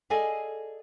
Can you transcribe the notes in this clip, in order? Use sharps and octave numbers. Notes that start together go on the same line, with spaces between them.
G#4 A4 D5 D#5 F5 G#5